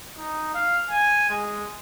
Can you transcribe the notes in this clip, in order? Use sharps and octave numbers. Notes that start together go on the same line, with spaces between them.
D#4
F5
G#5
G#3